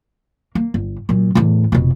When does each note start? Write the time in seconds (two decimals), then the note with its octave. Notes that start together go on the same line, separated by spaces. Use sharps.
0.55 A#3
0.74 G1
1.09 A#2 F#3
1.35 E2 A2
1.72 F1 B2